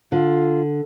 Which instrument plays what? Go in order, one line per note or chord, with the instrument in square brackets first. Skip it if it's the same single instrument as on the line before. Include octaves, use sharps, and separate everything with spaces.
[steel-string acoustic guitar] D3 [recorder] F4